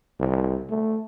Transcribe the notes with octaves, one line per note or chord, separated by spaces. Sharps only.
C2
A3